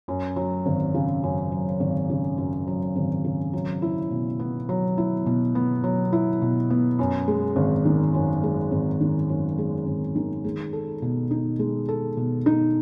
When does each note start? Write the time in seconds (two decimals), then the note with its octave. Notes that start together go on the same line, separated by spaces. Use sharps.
0.08 F#2
0.36 F#3
0.66 G#1
0.94 C#3
1.23 F#2
1.52 F#3
1.80 G#1
2.10 C#3
2.38 F#2
2.67 F#3
2.96 G#1
3.24 C#3
3.53 F#3
3.82 E4
4.11 B2
4.40 B3
4.69 F#3
4.98 E4
5.26 B2
5.55 B3
5.84 F#3
6.13 E4
6.42 B2
6.70 B3
6.99 F#2
7.28 G#3
7.56 G#1
7.85 D#3
8.14 F#2
8.43 G#3
8.71 G#1
9.01 D#3
9.29 F#2
9.58 G#3
9.86 G#1
10.16 D#3
10.44 G#3
10.73 A4
11.02 B2
11.31 D#4
11.59 G#3
11.88 A4
12.17 B2
12.46 D#4